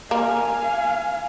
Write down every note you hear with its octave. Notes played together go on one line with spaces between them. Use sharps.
A#3 F5 G#5